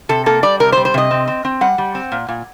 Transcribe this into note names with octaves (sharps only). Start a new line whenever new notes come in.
C3 A4
A#3 A4
G3 D5
C3 A#4
C5
G3
C5
C3 D#5
C4
C4
C4
G3 F#5
G3
C4
A#2
A#2